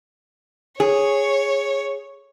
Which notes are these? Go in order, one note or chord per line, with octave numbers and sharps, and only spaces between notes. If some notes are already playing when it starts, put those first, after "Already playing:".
G#4 C#5